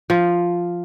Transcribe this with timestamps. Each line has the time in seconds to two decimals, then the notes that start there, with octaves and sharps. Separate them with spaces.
0.10 F3